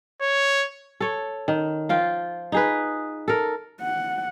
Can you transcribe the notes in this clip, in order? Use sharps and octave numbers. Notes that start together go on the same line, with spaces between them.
C#5
A4 C#5
D#3
F3 F4 G5
D#4 G#4 B4
A4 A#4
F#5